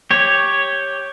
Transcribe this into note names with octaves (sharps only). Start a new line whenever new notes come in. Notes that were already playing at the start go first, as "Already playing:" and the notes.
G4 C#5